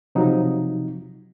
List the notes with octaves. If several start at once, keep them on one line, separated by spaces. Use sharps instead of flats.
C3 F3 F#3 D#4